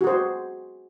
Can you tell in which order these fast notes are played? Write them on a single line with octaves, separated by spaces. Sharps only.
F#4 G#4 C5